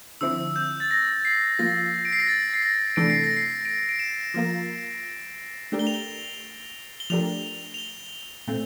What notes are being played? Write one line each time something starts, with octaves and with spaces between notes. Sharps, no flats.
D3 F3 C4 E4 E6
G6
A6
A#6
C7
F3 A#3 F4 A#6
D7
C7
A#6
A6
C7
A#6
C3 E3 A3 D4 A4 D7
C7
A#6
C7
D7
D7
E7
F3 A#3 F4 A#4
A3 D4 G4 A#4
G7
F7
G7
G7
F3 A3 D4 G4 A#4 F7
F7
G7
A#2 A3 C4